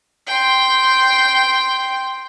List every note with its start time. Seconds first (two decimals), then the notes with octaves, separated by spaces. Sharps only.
0.27 G5 C6